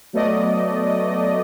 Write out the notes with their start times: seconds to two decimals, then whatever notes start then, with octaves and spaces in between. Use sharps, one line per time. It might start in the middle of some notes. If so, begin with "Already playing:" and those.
0.13 F#3 A3 B3 D5 D#5